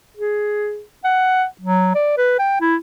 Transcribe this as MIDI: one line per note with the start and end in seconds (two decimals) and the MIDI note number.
0.17 0.82 68
1.04 1.45 78
1.61 1.93 54
1.95 2.14 74
2.17 2.36 71
2.39 2.57 79
2.60 2.75 64